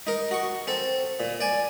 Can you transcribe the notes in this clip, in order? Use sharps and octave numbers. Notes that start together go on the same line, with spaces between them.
D#4 A#4
F#4 C#6
C4 A4
A#2
D5 G#5